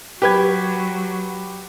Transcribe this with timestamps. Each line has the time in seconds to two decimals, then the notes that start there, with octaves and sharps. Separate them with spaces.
0.22 F#3 G4 B4 G#6